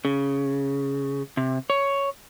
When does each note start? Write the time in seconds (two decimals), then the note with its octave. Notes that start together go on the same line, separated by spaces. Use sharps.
0.05 C#3
1.37 C3
1.70 C#5